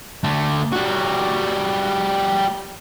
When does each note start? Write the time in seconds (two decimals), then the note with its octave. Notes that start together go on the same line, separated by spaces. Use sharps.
0.24 D3 A3
0.73 G3 F#4